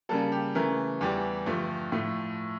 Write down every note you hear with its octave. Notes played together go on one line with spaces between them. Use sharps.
C#3 G3 A#3 A4
G4
C#3 E3 A3 A#4
E2 E3 G3 G4
G2 D3 F3 A3
A2 F3 A3